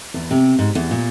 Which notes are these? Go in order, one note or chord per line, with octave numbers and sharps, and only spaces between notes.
E2
C3
G#2
E2
A#2